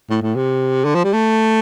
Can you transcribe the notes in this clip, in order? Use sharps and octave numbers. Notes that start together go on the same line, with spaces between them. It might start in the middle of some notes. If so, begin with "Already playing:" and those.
A2
A2
C3
D3
F3
G3
A3